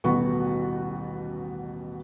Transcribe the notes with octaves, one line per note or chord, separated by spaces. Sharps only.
D#1 A1 B2 B3 F#4 C#6